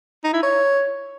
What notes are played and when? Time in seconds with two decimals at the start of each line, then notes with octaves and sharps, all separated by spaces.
0.24 D#4
0.33 E4
0.43 C#5